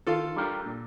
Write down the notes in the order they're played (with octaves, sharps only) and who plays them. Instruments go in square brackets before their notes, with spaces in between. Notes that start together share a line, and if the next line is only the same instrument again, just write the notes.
[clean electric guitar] D#3 [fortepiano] F4 A4
[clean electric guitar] G3 D4 G4 A#4
A#2